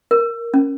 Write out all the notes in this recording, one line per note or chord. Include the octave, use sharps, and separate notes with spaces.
A#4
C#4